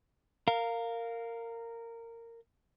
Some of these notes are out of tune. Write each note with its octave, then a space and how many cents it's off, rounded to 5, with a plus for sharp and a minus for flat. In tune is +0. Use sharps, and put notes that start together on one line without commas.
A#4 -15 F5 +0